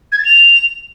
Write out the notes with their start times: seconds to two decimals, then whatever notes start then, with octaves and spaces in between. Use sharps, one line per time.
0.12 G#6
0.18 A6
0.25 F7